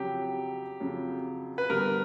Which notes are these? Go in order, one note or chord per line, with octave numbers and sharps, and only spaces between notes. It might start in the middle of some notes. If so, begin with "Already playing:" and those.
Already playing: F2 C#3 F#3 G4
F2 C#3 F#3
B4
G2 D3 G3 B3 A#4